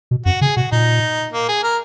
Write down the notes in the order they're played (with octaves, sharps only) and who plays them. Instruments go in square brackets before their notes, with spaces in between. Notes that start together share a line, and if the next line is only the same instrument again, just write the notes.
[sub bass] B2
[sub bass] F#2 [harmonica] F#4
[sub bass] C#3 [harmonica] G#4
[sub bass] B2 [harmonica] F#4
[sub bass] A#2 [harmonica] D#4
[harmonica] A#3
G#4
A#4